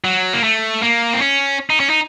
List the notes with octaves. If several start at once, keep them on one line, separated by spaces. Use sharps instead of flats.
F#3
A#3
A3
A#3
C4
C#4
D#4
C#4
D#4